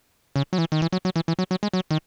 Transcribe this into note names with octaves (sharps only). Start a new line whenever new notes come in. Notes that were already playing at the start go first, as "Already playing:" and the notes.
C#3
F#3
E3
D#3
E3
F#3
F#3
E3
E3
F#3
F#3
G#3
F#3
D#3